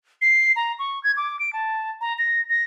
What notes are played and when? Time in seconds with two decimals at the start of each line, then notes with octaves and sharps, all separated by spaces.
0.22 C7
0.56 A#5
0.79 C#6
1.04 G#6
1.17 D6
1.39 D7
1.53 A5
2.01 A#5
2.18 A#6
2.49 A#6